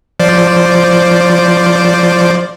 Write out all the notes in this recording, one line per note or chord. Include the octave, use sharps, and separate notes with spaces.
F3 C5 D5